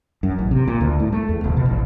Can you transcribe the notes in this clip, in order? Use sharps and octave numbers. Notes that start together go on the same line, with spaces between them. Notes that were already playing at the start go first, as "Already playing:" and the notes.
F#2
A1
C3
A#2
D2
A2
A3
E2
D#1
B2
A1